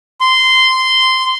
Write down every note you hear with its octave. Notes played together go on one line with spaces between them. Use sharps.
C6